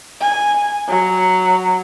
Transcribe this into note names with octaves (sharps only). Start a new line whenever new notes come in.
G#5
F#3